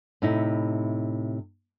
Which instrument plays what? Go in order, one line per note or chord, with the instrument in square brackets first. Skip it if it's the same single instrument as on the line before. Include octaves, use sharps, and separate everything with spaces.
[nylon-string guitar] A2 C3 D#4 E4